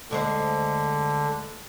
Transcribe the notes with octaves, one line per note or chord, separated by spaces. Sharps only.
D2 D3 G#3 C5